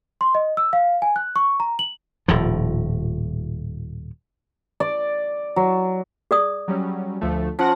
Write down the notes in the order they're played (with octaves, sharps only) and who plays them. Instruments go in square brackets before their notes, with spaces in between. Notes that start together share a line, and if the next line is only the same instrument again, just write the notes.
[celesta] C6
D#5
E6
F5
G#5
F#6
C#6
A#5
F#7
[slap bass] D#1 A2 F3
[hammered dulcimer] D5
F#3
[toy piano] G#4 D5 D#6
[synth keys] F#3 G3 C#4
D2 F3 A3
[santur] F3 [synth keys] C#4 F#5 A#6